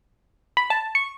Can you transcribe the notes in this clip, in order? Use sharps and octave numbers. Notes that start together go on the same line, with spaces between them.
B5
A5
C#6